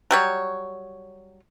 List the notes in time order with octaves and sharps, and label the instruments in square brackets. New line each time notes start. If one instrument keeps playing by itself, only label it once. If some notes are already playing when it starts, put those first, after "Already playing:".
[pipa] F#3 G3 C#5